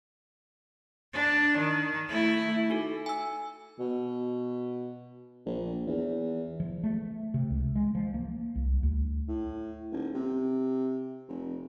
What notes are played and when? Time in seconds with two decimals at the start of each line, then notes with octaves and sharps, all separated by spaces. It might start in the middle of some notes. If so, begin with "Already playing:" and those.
1.13 D4
1.57 D#3
2.08 A3 E4
2.70 D#4 F#4 A4
3.06 G#5 E6
3.79 B2
5.46 A#1
5.86 E2
6.60 F3
6.84 A3
7.34 C3
7.50 C#2
7.76 G#3
7.95 F3
8.14 A#3
8.55 C2
8.83 D2
9.28 A2
9.92 D#1
10.15 C3
11.28 F1